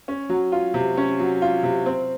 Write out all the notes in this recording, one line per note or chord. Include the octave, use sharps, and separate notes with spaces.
C#4
F#3
F4
C3
C#4
F#3
F4
C3
C4